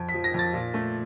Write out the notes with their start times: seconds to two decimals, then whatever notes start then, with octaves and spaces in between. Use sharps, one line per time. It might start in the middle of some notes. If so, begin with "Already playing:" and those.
Already playing: F2
0.09 B6
0.14 F3
0.24 A#6
0.34 F2 A6
0.54 A#2
0.74 A3